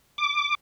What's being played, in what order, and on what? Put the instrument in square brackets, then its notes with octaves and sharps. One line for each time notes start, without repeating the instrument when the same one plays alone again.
[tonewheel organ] D6